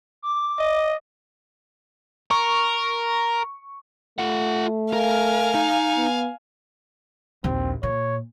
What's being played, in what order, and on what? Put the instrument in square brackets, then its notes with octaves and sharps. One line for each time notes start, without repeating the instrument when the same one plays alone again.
[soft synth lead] D6
[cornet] D#5
[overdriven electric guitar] A#4 [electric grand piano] C#6
[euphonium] A3 [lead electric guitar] F4 F#5
[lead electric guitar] A#4 [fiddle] F5 G#5
[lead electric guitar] D#4
[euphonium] B3
[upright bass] A#1 D#2 [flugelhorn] C4
[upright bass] A#2 [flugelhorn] C#5